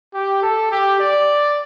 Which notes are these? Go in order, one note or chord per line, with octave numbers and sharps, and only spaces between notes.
G4
A4
G4
D5